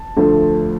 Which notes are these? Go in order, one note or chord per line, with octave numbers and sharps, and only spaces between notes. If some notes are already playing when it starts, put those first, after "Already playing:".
Already playing: A5
D2 D3 F3 A3